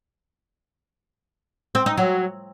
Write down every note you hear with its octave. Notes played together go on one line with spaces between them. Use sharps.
C4
D#4
F#3